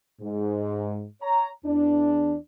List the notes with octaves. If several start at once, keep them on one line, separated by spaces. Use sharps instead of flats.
G#2
C#5 A#5
E2 D4